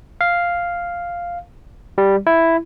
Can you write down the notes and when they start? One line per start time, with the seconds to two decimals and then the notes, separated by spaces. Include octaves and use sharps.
0.21 F5
1.98 G3
2.27 E4